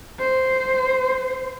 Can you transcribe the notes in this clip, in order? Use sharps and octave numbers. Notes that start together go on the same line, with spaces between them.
C5